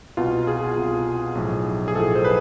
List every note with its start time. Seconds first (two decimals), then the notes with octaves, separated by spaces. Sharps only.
0.17 C2 B2 F4
0.47 G#4
0.77 C2 B2
1.35 B1 A2 F3
1.88 G#4
1.95 B1 A2 F3 A4
2.15 C5
2.25 B4